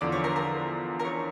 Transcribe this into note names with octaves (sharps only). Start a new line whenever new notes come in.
E2 D3 F3 D5
C#5
A#4
A#4
A#4
C#5